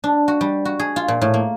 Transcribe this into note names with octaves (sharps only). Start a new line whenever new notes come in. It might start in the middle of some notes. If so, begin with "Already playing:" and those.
D4
F#4
G3
F#4
G#4
F4
A#2
A2
A#3